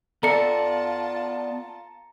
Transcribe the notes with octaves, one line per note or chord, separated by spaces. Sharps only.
B3 F4 A4 D5 A5 A#5 C#7